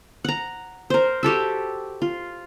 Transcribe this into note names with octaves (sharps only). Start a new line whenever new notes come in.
F#5 A#5
A#4 C5
F#4 G4 A4 E5
F4